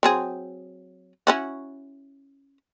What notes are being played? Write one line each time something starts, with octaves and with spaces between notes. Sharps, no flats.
F#3 C4 G#4
C#4 E4 F#4